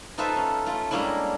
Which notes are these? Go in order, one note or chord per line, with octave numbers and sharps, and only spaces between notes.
D#4 F4 A4 B4 C5 E5
C#4
A3 F4
G3 G#3 A#3 C#4 D4 E4